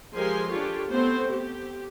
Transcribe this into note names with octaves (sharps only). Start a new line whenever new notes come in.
F3 G#3 G4 A#4 G#5 C6
D4 F4 G4 A4 C#5
A3 B3 C4 C5
G4